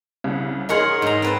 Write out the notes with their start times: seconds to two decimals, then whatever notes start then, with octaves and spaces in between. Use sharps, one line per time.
0.24 C2 C#3
0.69 D#4 G#4 A#4 C#5 F#5 C6
1.02 G#2 A#5
1.22 C4 B4 A5